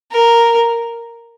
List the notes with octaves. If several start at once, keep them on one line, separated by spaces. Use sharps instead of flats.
A#4